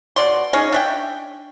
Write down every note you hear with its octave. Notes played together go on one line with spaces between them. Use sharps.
B2 D5 C6
C#4 D#4 G#4 C#5
D4 E5 G5